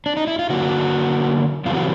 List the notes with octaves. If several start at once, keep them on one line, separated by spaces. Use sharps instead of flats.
D4
D#4
E4
F4
D3 F#3 A#3 F#4
F#2 C#3 E3 G3 C4 F4
F#4